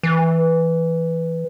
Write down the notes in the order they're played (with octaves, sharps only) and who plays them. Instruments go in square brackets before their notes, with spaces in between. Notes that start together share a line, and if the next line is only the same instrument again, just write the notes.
[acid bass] E3